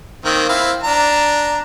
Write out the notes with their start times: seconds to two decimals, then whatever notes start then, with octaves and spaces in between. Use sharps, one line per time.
0.25 D#3 A#3 C4
0.49 C4 E4 F5
0.84 D4 A#5